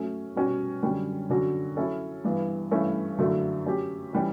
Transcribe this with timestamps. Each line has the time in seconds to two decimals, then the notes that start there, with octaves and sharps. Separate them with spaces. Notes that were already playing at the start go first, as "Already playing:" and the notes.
Already playing: F#3 A3 C#4
0.36 B2 G3 C#4 F#4
0.82 F#2 D3 G3 C#4
1.30 D3 F#3 C#4 F#4
1.76 F#3 C#4 E4 A4
2.25 G2 E3 B3
2.71 G2 E3 A3 C#4 E4
3.18 F#2 D3 F#3 A3 E4
3.66 F#3 C#4 G4
4.13 E3 G3 C#4